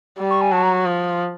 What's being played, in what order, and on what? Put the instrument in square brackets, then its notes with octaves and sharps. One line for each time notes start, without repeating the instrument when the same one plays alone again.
[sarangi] G3
[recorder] C#6
G#5
[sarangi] F#3 [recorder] A5
[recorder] A#5
[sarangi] F3